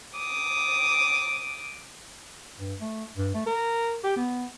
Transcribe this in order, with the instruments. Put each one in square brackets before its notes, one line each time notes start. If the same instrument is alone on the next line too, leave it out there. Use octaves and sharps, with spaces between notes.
[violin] D6 D#6
[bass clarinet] G2
A3
G2
A3
A#4
G4
B3